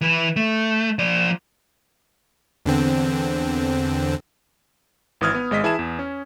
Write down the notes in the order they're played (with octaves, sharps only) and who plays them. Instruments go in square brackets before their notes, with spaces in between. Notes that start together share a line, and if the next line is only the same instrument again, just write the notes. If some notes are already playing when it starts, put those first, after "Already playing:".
[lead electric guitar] E3 B4
A3
F3 D5
[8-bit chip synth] E2 D3 C4
[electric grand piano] G#1 E3 D#6 F6 G#6
B3
G#1 G#3 D#5 B6
E3 E4 G#4 A5 G#6 E7
E2
C#4